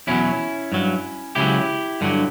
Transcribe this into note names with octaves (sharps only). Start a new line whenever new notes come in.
E2 B2 F#3 C#4 E4
G2 F#3
C#2 C#3 F#3 E4 G4
G2 D3 F#3